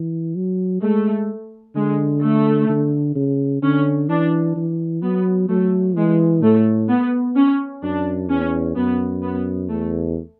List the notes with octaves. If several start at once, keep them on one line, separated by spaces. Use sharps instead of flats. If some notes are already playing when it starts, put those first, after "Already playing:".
Already playing: E3
F#3
G#3 A3
D3 G#3
A3
D3
C#3
D3 C#4
E3 D4
E3
F#3 B3
F#3 A3
E3 G#3
A2 A3
B3
C#4
F#2 D4
E2 C#4
F#2 B3
B3
E2 A3